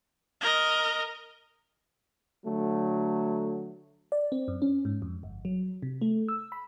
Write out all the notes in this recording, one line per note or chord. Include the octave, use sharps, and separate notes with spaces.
A#4 D#5
D3 F#3 A3
D5
C4
F#2
C#4
G#2
F2
G1
F#3
C3
A3
E6
B5